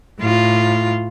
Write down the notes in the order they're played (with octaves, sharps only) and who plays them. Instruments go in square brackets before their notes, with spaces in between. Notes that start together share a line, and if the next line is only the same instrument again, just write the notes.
[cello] A2 F4